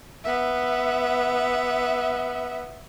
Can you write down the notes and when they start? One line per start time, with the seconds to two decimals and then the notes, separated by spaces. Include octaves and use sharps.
0.24 B3 E5